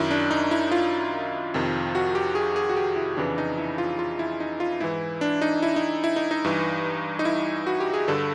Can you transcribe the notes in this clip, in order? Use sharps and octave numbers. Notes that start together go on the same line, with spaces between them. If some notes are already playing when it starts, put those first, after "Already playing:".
Already playing: F#2 D#3 E4
D4
D#4
E4
F4
F2 C3 D#3
F#4
G4
G#4
G#4
F#4
G4
E4
F2 C#3 E3 D4
D#4
E4
F4
F4
E4
D#4
F4
G#2 E3 E4
D4
D#4
E4
D#4
E4
D#4
D#4
G2 E3
D#4
E4
F#4
G4
G#4
G2 D3 A4